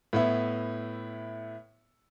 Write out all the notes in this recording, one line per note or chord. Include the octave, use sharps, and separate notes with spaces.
A2 B3 E4